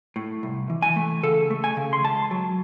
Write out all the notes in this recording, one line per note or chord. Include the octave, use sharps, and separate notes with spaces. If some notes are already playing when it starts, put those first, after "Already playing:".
A2
C2
E3
G#5
A3
C#3 A4
A3
G#5
C#3
C6
C#2 A5
F#3